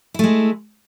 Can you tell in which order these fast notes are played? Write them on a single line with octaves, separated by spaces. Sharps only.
E4 A3 G#3